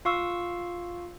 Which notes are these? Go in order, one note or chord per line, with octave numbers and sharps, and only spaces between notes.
F4 F5 C#6 E6